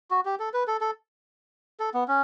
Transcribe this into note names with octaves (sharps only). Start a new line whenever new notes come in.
F#4
G4
A4
B4
A4
A4
A4
B3
C#4